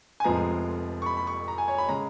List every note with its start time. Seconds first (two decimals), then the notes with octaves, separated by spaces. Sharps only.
0.20 G#5
0.24 F1 F2 F3 G#3 B3 A#5
1.02 C#6
1.06 B5
1.17 B5
1.27 C#6
1.48 A#5
1.58 G#5
1.68 C#5
1.78 B5
1.88 C#3 G#3 A#5